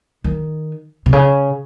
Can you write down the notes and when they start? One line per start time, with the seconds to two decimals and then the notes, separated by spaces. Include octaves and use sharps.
0.24 D#3
1.06 C3
1.13 C#3